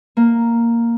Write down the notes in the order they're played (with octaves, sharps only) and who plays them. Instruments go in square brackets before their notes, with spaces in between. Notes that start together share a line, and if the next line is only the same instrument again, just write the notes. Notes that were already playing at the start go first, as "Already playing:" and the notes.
[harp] A#3